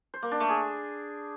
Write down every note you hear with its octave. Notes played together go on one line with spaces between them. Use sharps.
C5
A#3
D4
A3
G#4